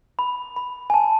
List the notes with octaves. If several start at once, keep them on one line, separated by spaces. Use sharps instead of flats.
B5
B5
G#5
A5